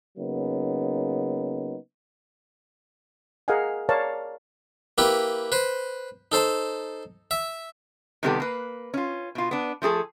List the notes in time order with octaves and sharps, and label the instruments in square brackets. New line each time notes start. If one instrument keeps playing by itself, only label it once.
[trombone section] C#3 F#3 A#3 B3 C#4 D#4
[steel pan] G#4 A#4 D#5 F5 F#5 G#5
A#4 C#5 D5 F5 A5
[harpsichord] A#3 E4 G4 B4
B4 C5
D#4 A4 C5 A5
E5
[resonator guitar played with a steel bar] C3 D#3 G3 B3 G4 A4
A#3 B4
C#4 F4
B2 F4
B3 D4
F3 A3 G#4 A4